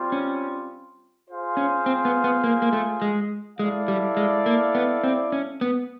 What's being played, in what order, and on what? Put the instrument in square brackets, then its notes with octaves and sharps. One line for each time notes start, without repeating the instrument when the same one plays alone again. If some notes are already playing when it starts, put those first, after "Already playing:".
Already playing: [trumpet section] G3 C4 F4
[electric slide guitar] C#4
[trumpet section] F4 G#4 C5 F5
[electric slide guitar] C#4
C4
B3
B3
A#3
A#3
A3
G#3
[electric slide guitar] G#3 [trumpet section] E4 A4 D5 F5
[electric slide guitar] G3
G#3
A#3
B3
C4
C#4
B3